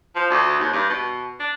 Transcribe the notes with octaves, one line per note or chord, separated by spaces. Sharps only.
F3
D2
D#2
G2
B2
D4